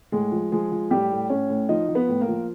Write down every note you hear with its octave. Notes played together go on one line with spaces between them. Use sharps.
A2 G#3 G#4
F3
F3 G#3 G#4
F3
A2 G3 G4
A2
A2 C#4 C#5
A2
F3 D#4 D#5
F3
B3 B4
A2
A#3 A#4
F3